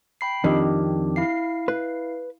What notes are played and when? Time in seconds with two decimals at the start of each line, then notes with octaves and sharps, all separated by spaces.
0.21 G5 B5 C7
0.44 F2 D#3 C4 D4 G4
1.16 E4 F5 C7
1.68 B4